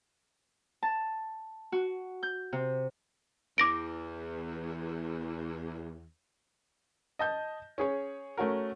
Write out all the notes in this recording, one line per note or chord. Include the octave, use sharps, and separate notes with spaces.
A5
F#4
G6
C3
E2 D6 A#6 D7
D#5 A5 G6
C#4 G#4 C#5
A3 C#4 F#4 A#4